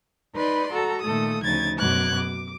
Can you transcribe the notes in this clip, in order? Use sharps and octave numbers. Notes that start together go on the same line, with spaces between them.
D#4 B4 D5 B5 C6
F#4 A4 A#5
A#2 D#3 A3 A4 D#6
D2 C#3 F3 D#4 G#6 A6
F#2 B2 F#3 D6 F#6 G#6
D6